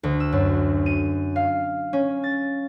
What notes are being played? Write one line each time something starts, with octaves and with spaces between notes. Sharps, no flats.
D2
E6
F#2
D#7
F5
C#4
A6